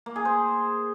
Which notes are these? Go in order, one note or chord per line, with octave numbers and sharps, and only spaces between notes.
A#3
G#4
C5